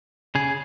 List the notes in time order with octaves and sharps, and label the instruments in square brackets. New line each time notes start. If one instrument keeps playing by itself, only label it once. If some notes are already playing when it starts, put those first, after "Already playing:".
[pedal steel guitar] C#3 G#4